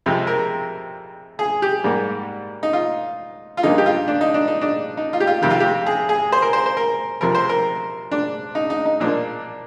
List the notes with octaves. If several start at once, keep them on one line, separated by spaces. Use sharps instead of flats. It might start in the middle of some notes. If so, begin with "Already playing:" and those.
F2 C3 F3 G#3
A#4
G#4
G4
G#2 G3 A#3
D#4
F4
F4
G2 D3 F3 A#3 D#4
G4
F4
D4
D#4
D4
D#4
D4
D#4
F4
G4
F4
F2 C3 D#3 G4
F4
G4
G#4
G#4
C5
A#4
C5
C5
A#4
F2 C3 F3 A#4
C5
A#4
D4
D#4
D#4
D#4
A#2 F3 A#3 D4